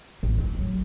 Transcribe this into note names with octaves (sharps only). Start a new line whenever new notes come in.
A1
C4
F#3